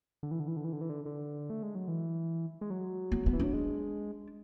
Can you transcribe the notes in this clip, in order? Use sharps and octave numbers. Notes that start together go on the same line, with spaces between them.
D3
E3
D3
E3
D3
E3
D3
E3
D3
D3
A3
G#3
F#3
E3
G#3
F#3
B3
B3
E3
F#3 D4
G#3